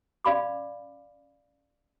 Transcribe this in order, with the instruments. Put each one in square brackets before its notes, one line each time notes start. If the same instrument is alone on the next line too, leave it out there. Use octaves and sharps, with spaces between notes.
[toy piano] C#4 D5 F5 B5 D6